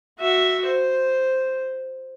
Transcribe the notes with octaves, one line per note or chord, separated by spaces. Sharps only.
F#4 E5
C5